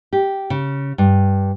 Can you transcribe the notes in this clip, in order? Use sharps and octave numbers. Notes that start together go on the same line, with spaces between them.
G4
C#3
G2